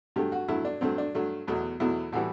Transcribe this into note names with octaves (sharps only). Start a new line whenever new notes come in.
G2 F#3 A3 G4
F#4
G2 F#3 A3 E4
D4
G2 F#3 A3 C4
D4
G2 F#3 A3
E2 B2 F#3 A3
E2 B2 F#3 A3 E4
A2 E3 G3 F#4